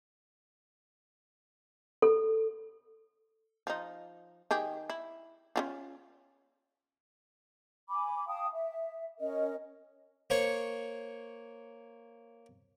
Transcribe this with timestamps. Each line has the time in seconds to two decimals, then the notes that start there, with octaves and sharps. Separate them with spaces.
2.02 A4
3.67 F3 D#4
4.51 D#3 G4 G#4
4.90 E4
5.56 C#4 E4 F4
7.89 G#5 B5 D6
8.28 F5 G5 A5 D#6
8.53 E5
9.20 C#4 A#4 D#5
10.30 A#3 C5 C#5 C#6